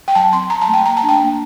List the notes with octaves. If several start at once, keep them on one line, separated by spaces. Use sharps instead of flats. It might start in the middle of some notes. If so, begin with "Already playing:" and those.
G5
F#3 A5
C4 C6
F#3 A#5
A5
A3
G5
A#3 A#5
A5
D4
G5
A#3